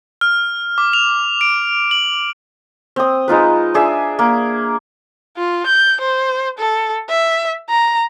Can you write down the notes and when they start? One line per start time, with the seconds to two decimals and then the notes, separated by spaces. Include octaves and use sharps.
0.21 F6
0.78 D6
0.93 F7
1.41 D7
1.91 F#7
2.96 C4 D#6
3.28 G#3 D#4 F4 B4
3.74 D4 G#4 E5
4.19 A#3
5.37 F4
5.66 G6
6.01 C5
6.58 A4
7.09 E5
7.70 A#5